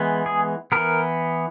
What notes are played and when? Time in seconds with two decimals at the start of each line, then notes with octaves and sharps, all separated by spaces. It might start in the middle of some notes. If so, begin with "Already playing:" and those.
Already playing: E3 G#3 B3
0.26 G#4
0.72 E3 B3 A#4